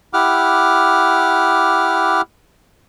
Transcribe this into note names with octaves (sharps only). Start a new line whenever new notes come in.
E4 G4 F#5 D6 F6